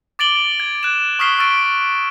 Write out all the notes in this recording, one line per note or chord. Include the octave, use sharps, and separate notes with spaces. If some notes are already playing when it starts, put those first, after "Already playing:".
D6 A6 D7 F#7 G7
G#6
F#6 E7
C#6 D#6 F6 B6 C7 G7
C#6 E6 F6 A6 D7